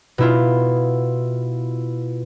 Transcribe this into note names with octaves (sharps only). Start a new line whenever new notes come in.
B2 E4 F4